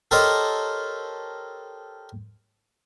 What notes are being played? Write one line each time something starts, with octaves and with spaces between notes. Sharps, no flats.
G4 A4 A#4 C5 C#5 D#5